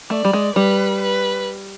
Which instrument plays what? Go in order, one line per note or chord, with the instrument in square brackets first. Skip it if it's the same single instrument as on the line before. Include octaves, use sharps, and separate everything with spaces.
[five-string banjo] A3 [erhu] D5
[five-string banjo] G3
G#3
[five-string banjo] G3 [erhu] B4
[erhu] B4